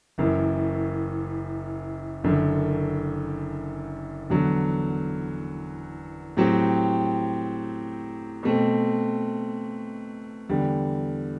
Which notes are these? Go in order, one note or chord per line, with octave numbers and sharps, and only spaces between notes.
F#1 F#2 E3
F#1 F#2 D3
E2 D3 F#3
A2 F#3 C4 G4
B2 A3 C4
E2 D3 G3